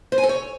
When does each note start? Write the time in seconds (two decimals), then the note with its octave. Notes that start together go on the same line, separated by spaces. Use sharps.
0.12 C5
0.18 G#5
0.23 A4
0.29 C#5